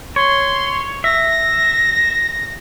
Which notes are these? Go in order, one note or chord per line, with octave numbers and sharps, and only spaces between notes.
C#5 C6
E5 A#6